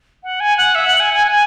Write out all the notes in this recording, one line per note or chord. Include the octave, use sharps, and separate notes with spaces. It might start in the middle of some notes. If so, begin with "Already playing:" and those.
F#5
G#5
F#5
E5
F#5
G#5
G#5
G#5